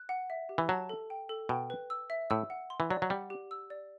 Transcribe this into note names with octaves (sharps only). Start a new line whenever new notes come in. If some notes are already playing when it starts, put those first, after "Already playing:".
Already playing: F#6
F#5
E5
G4
E3
F#3 A5
A4
G5
A4
B2 G5
B4
E6
E5
A2 E6
F#5
C6
E3
F#3 D5
F#3
G3 F#5
G4
E6
D5